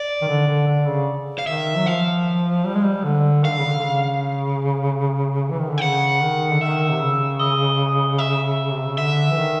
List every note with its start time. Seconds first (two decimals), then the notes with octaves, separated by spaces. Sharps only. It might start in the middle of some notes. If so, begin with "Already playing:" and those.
Already playing: D5
0.22 D#3
0.28 D3
0.48 D3
0.68 D3
0.87 C#3
1.38 F5
1.47 D#3 E5
1.77 F#3
1.86 F3 F5
2.65 G3
2.75 G#3
2.83 G3
3.04 D3
3.44 D#3 F5
3.51 D3
3.59 C#3
3.66 D3
3.79 D3
3.83 C#3
5.50 E3
5.60 D#3
5.70 D3
5.78 G5
5.81 C#3 F#5
6.22 D#3
6.53 D3
6.61 D#3 E5
6.91 C3
7.00 C#3
7.39 D#5
8.18 E5
8.71 C3
8.84 C#3
8.98 D3 E5
9.31 E3
9.38 D#3